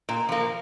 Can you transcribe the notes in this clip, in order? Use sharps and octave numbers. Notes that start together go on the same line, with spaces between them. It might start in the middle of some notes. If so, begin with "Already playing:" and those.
A#2
F3 A#3